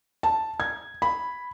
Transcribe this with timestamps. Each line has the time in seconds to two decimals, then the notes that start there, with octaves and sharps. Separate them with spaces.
0.23 A5
0.60 G#6
1.02 B5